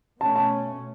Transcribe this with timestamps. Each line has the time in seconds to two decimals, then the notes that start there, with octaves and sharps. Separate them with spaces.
0.21 B2 A3 C#4 A5
0.36 A5